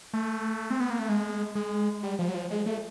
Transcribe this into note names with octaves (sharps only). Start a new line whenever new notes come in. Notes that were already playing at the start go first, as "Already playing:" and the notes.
A3
C4
B3
A#3
A3
G#3
G#3
G3
F3
F#3
F3
G#3
A3